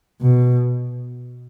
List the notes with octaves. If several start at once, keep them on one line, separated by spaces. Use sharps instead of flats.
B2